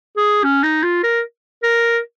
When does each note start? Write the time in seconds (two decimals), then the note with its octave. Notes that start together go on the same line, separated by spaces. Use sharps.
0.17 G#4
0.44 C#4
0.63 D#4
0.83 F4
1.03 A#4
1.63 A#4